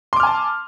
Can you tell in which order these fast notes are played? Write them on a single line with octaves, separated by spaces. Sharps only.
C6 D6 F6 G#5 A5